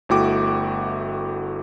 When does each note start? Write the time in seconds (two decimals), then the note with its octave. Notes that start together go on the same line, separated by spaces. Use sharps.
0.09 G1 A3 E4 F#4 G5 D6